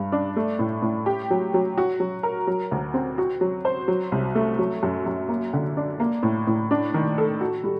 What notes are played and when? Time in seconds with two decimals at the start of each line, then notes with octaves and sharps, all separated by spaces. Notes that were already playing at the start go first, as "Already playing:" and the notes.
Already playing: G2
0.12 D4
0.36 A3
0.59 A2
0.82 A2
1.06 G4
1.31 F#3
1.54 F#3
1.78 F#4
2.00 F#3
2.23 A#4
2.47 F#3
2.72 D2
2.94 C4
3.18 F#4
3.41 F#3
3.65 C5
3.88 F#3
4.12 C2
4.35 A3
4.59 F#3
4.83 F#2
5.06 F#2
5.29 A#3
5.53 D3
5.77 D4
6.00 A#3
6.23 A2
6.47 A2
6.71 D4
6.94 D#3
7.18 A4
7.41 F#4
7.64 G3